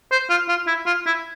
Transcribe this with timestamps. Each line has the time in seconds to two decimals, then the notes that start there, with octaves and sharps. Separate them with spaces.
0.12 C5
0.30 F4
0.49 F4
0.67 E4
0.86 F4
1.06 E4